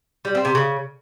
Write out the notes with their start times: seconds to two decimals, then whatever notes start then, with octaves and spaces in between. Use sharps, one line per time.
0.25 G3
0.35 C4
0.45 C3
0.55 C#3